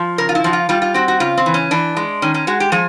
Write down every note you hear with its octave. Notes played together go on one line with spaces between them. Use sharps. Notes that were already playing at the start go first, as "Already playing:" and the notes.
Already playing: F3
C#3 A#4
F4
E4
F3 F#4
F4
G3 F4
F4
C4 F#4
F#4
C#3 F4
C4
E3
C#4
E3 D4
G#3
D#3 C#4
C#4
G#3 F#4
G4
F3 G#4